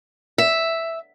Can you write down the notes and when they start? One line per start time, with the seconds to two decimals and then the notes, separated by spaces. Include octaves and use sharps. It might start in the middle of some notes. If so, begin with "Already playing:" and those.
0.38 E5